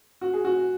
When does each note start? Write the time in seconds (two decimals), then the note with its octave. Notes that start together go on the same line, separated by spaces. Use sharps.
0.21 F#4
0.33 G#4
0.45 F#4